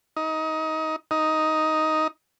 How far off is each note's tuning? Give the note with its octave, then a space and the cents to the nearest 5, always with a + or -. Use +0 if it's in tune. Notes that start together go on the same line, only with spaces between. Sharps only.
D#4 +25
D#4 +10